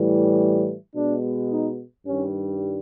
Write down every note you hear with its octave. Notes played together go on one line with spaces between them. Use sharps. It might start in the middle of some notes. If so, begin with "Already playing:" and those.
Already playing: A2 E3 G3
B2 G#3 B3 D4
D#4
G2 D#3 G3 C#4